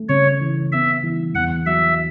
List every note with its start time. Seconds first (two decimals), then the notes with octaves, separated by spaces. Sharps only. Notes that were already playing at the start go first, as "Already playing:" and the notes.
Already playing: A3
0.09 C#3 C#5
0.40 E3
0.72 B3 E5
1.03 E3
1.34 E2 F#5
1.66 F#3 E5